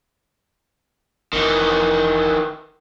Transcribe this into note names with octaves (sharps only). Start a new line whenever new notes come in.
F1 D#3 E3